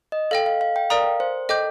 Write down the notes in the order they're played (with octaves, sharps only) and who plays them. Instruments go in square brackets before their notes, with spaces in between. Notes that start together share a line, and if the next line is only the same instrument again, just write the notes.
[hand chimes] D#5
[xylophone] A4 D#5 G5 [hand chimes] F5
[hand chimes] F5
F5
G5
[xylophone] A#4 D5 G5 A#5 D#6 [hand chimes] F5
[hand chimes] C5
[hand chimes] A4 [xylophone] D#5 G5 D6 G6